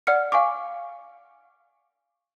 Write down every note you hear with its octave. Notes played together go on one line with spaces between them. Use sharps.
D5 F#5 F6 C#7
F5 G#5 C#6 D6